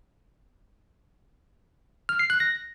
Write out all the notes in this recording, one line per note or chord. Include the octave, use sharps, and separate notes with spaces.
F6
C7
F#6
A#6